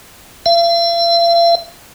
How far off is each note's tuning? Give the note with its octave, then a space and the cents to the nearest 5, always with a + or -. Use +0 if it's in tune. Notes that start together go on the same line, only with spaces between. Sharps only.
F5 -45